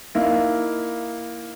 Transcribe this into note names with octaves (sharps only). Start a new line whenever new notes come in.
A#3 D#4 E4